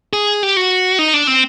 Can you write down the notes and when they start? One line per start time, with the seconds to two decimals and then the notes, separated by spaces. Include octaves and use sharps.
0.13 G#4
0.43 G4
0.57 F#4
0.99 D#4
1.14 D4
1.27 C4